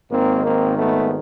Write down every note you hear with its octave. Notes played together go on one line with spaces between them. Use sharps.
G#1 G#2 D#3 A#3 C4
A#3 C4
A3 B3